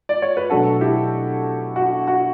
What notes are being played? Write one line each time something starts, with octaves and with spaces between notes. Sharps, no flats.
D5
C#5
B4
B2 F#3 A3 D4 F#4 A4
E4 G4
F#4
F#4